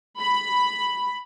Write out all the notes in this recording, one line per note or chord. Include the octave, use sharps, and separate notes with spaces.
B5